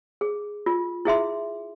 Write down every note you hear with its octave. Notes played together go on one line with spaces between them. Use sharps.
G#4
F4
E4 G#4 E5 C6